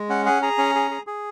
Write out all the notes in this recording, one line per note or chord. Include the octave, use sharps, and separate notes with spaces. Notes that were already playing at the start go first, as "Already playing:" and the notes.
Already playing: G#3
C#4 F#5
G#4 F#5
G#4 A#5
C#4
G#4
G#4
G#4